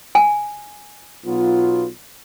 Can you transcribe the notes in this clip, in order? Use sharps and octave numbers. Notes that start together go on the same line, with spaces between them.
G#5
B1 B2 F#3 B3 F4